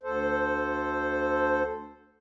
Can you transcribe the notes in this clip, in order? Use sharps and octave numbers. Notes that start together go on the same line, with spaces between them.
D2 A4 C5